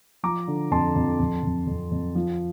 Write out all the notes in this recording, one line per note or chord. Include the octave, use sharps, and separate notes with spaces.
F3 A#5 D6
D3
F2 A5 C6
F2
F2
F2
F2
F2
F3